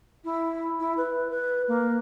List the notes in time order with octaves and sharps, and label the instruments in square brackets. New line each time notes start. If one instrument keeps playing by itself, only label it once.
[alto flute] E4
E4
B4
B4
A#3